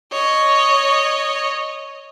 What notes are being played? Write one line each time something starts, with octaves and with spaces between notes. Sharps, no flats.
C#5 D#5